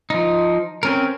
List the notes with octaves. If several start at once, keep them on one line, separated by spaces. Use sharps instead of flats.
F3 D#4
C4 C#4 A#4